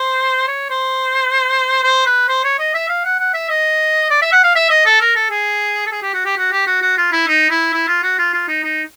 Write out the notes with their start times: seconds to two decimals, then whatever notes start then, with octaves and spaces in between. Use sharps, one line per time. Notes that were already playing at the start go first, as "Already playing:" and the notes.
Already playing: C5
0.48 C#5
0.70 C5
1.84 C5
2.06 B4
2.29 C5
2.44 C#5
2.59 D#5
2.75 E5
2.89 F5
3.05 F#5
3.20 F#5
3.34 E5
3.50 D#5
4.10 D5
4.22 E5
4.32 F#5
4.44 F5
4.56 E5
4.70 D#5
4.86 A4
5.01 A#4
5.16 A4
5.31 G#4
5.87 A4
5.92 G#4
6.02 G4
6.14 F#4
6.25 G4
6.38 F#4
6.52 G4
6.67 F#4
6.82 F#4
6.98 F4
7.12 E4
7.27 D#4
7.50 E4
7.73 E4
7.88 F4
8.03 F#4
8.19 F4
8.34 F4
8.48 D#4
8.64 D#4